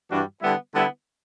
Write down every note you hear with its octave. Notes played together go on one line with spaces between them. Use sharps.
G2 E3 G3 D4 F#4
D3 G3 B3 E4
D3 G3 B3 E4